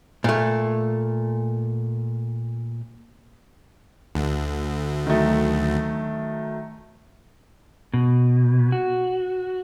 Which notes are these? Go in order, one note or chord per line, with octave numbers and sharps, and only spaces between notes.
A#2 A3
D2
D#3 F#3 A3
B2
F#4